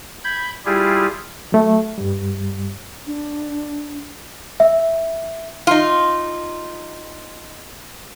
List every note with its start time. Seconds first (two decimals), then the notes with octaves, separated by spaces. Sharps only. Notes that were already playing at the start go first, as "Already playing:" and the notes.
0.24 B5 G6 G#6
0.66 G3 E4 F4 G4 G#4
1.52 F#3 A3
1.98 G2 G3
3.07 D4
4.60 E5
5.67 D#4 F4